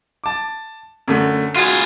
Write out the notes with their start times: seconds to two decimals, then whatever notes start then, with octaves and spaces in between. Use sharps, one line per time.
0.24 A5 D6
1.08 F#2 D3 A3
1.56 F4 F#4 G#4